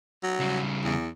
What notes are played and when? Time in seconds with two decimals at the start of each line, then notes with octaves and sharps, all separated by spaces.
0.23 F#3
0.40 C#3 G3
0.84 E2